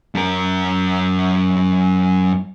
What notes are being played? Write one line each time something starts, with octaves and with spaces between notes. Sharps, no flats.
F#2 A#4